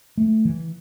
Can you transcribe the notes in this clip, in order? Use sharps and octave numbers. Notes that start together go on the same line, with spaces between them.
A3
E3